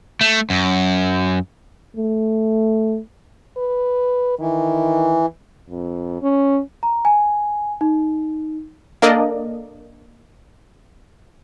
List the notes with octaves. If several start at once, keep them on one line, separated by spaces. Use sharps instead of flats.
A3
F#2
A3
B4
D#3 E3
F2
C#4
A#5
G#5
D#4
A#3 D4 A4 A#4 D5 D#5